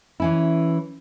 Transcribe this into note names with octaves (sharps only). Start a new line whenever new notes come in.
E3 C#4 E4